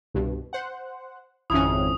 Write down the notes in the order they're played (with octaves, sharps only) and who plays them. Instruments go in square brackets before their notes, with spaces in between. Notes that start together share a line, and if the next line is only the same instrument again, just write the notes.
[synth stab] C2 G2 B2
C5 F#5
[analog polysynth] G#1 F2 [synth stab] C#4 E4 [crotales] D#6